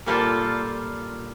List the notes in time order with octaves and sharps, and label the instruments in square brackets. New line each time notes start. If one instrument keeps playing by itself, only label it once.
[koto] A#2 G3 A#3 F4 A4